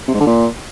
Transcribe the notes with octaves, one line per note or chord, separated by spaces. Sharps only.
C3
G#2
D3
A#2